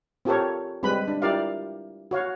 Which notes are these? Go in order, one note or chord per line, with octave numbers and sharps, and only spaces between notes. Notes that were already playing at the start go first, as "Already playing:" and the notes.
C4 F4 G4 A4 A#4 C#5
G3 G#3 C4 B4 B5
D4
E4 F4 G4 A#4 D5 F5
F#4 C#5 F5